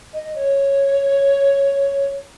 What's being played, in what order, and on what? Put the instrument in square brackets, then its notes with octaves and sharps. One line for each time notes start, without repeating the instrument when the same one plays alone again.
[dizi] D#5
C#5